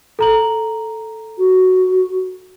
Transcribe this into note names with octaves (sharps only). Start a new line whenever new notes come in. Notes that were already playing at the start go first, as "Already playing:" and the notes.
A4 A#5 F#7
F#4